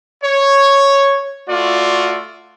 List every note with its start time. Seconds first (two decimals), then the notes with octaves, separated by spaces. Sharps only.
0.24 C#5
1.48 A3 F4 F#4 D5